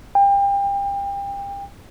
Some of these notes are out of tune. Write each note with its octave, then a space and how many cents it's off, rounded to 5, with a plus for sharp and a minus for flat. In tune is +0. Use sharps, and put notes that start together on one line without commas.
G5 +30